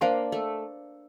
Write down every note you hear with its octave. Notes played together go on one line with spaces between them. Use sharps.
A#3 D4 C5 F5 A5 C6
A3